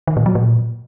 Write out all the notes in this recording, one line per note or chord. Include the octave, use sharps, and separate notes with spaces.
D#3
A#2
F#3
A#2